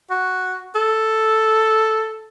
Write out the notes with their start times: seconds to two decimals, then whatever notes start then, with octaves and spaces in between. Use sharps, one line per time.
0.10 F#4
0.75 A4